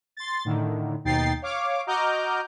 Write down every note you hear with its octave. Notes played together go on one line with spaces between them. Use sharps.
C6 A6
A2 D3 D#3
D#2 B2 D#4 G5 A6 C7
C#5 F5 D6
F#4 D#5 A#5 D6 F6 G6